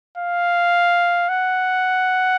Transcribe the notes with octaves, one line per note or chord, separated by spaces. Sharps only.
F5
F#5